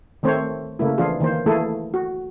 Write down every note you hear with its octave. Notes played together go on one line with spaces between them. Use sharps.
D#3 A3 C4 C5 C#5
C#3 A3 A#3 E4
E3 F3 D4 F4 G#4
D#3 E3 A#3 C5
E3 A3 A#3 E4 G#4 A4
F#4